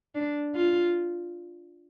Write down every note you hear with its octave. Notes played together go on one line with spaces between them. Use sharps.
D4
F4